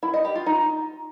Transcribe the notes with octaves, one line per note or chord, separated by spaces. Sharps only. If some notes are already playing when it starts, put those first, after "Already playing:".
E4
D#5
G4
F4
D#4